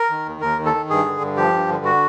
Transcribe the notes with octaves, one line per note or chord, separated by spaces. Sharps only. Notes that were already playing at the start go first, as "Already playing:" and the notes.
Already playing: A#4
D#3
D#2
D#2 A#4
D#3
A4
D#3
G2 G#4
D3
G2
F3 G4
G2
D3
F#4